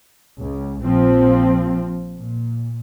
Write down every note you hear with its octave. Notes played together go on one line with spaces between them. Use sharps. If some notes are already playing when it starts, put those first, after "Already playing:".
C#2
A#1 F3 C4
A#2